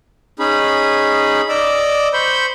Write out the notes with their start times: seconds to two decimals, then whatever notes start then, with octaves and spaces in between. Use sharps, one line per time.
0.39 C#4 D#4 G#4 B5
1.49 D5 D#5 D6 E6
2.13 C5 B5 C#6 G6